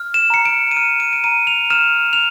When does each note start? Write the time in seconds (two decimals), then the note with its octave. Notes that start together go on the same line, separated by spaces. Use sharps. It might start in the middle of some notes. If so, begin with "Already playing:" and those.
Already playing: F6
0.14 E7
0.30 A#5 C#7
0.45 D7
0.71 D#7
0.77 F6 D7
1.00 D#7
1.13 D7
1.24 A#5 D#7
1.47 F7
1.70 F6 E7
2.13 F7